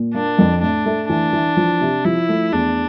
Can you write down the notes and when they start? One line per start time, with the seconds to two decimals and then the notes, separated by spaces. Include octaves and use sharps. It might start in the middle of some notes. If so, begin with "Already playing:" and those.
Already playing: A#2
0.14 A#3 D4
0.39 F2
0.62 A2 D4
0.86 A3
1.09 E3 D4
1.33 E3
1.57 F3
1.81 C3
2.04 F3 E4
2.29 A3
2.52 E2 D4